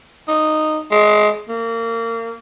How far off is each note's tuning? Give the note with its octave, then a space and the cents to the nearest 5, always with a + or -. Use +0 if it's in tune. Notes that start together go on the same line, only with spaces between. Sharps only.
D#4 -10
G#3 +20
A#3 -30